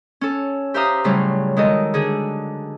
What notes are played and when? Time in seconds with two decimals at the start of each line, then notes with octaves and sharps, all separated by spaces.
0.21 C#4 A4
0.74 G4 C5 E5 F5 A#5 D#6
1.04 A2 C#3 F#3 G3 F4
1.56 D#3 G#3 F#4 A4 D#5
1.94 D3 G#4